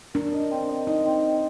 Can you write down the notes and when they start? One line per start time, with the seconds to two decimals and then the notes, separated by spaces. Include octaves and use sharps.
0.14 D4 A#4
0.32 D#5
0.51 C4
0.69 D#5
0.87 D#4 D#5
1.06 C4
1.24 D#5